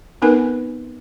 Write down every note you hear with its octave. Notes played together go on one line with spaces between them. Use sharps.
B3 C4 D#4 A#4 B4 G#5